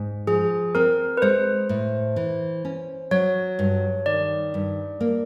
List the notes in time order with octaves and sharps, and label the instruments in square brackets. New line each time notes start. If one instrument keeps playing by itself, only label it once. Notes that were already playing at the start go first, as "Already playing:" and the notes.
Already playing: [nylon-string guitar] G#2
[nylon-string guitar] F3 [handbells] G#4
[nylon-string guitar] C4 [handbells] A#4
[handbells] B4
[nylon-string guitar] G#3 [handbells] C5
[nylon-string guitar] A2
E3
C#4
[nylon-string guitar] F#3 [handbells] C#5
[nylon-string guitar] G2
[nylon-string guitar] D#3 [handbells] D5
[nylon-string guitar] G2
A#3